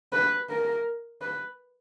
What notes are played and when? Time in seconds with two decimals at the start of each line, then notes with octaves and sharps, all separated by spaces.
0.12 B4
0.49 A#4
1.22 B4